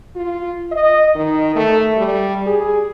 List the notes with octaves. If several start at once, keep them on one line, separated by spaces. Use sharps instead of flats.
F4
D#5
D#3
A3
G3
G#4